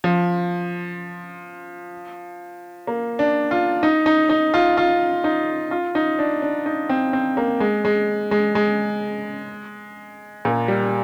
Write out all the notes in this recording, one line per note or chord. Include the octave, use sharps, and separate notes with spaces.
F3
A#3
D4
F4
D#4
D#4
D#4
F4
F4
D#4
F4
D#4
D4
D4
D#4
C4
C4
A#3
G#3
G#3
G#3
G#3
A#2
G3